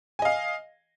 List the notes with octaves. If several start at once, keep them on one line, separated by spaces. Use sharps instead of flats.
D#5 F5 G#5